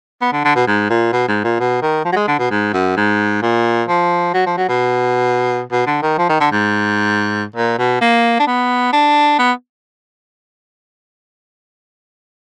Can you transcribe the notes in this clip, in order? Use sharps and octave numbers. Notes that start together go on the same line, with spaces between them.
B3
D3
D3
B2
G#2
A#2
B2
G#2
A#2
B2
D#3
F3
F#3
G#3
D3
B2
G#2
F#2
G#2
A#2
F3
F#3
F3
F#3
B2
B2
D3
D#3
F3
D#3
D3
G#2
A#2
B2
A#3
D4
B3
D4
B3